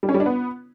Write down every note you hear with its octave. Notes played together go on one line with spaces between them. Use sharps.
G3
C#4
G3
D4
B3